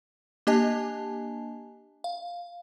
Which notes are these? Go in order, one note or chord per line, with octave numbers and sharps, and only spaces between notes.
A#3 D4 G4 D#5 G#5 A5
F5